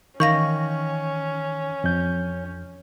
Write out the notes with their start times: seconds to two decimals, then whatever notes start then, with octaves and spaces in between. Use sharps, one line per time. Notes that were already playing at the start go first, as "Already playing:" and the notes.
0.20 D#3 E3 C#4 F5 C#6 A#6
1.84 F2 G6